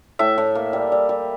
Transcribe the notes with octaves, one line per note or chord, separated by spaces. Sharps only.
A2 E5
A2
A#3
G3
G3
G3